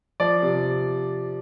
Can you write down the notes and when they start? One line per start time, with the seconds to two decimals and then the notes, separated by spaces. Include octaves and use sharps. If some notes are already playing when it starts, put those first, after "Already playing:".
0.20 F3 D5
0.42 C3